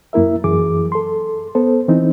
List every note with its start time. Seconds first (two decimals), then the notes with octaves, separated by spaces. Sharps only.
0.13 F#2 A#3 E4 A#4 E5
0.44 F#2 E3 G#4 D6
0.92 A4 C6
1.55 B3 A4 C5
1.88 E3 C4 D#4